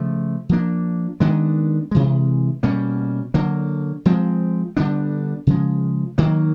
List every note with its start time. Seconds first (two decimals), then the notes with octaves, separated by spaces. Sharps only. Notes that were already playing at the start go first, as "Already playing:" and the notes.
Already playing: C#3 F3 A3
0.49 F3 A#3 D4
1.20 D#3 G#3 B3 D4
1.91 C3 E3 G#3
2.63 B2 G3 A#3 C#4
3.34 D3 F#3 A#3
4.05 F3 G#3 C4
4.77 D3 G3 B3 D4
5.47 C#3 F3 G#3
6.18 D#3 F#3 A#3